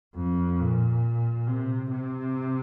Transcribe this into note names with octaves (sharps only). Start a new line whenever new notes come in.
F2
A#2
C3
C3